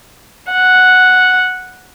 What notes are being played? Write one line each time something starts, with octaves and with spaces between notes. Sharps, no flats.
F#5